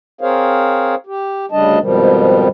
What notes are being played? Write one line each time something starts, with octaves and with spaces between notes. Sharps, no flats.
C4 G#4 A#4 C5 C#5 F5
G4
D2 C#3 G3 D4 D#5 A5
F2 G#2 B2 D#3 F3 G3